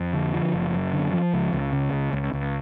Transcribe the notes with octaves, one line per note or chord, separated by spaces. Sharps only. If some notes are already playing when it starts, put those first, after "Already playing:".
Already playing: F2
D3
F3
F#1
F#2
D3
F3
C#2
C#2
C#3
C#2
C#2
C#2